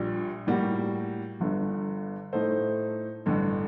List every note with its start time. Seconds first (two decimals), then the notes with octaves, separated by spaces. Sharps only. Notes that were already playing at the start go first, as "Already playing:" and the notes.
Already playing: A#1 A#2 G3 D4
0.47 A2 G3 A#3 F#4
1.40 G1 G2 D3
2.33 A2 A3 D#4 A4 C5
3.26 A1 G2 D3